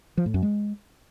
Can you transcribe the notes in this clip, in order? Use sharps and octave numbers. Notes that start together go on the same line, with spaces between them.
F3
A2
F#2
G#3